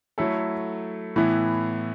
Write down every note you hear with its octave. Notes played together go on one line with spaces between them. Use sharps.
F#3 A3 E4 A4
A2 E3 B3 E4